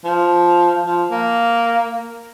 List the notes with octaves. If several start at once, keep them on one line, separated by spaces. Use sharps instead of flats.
F3
F3
A#3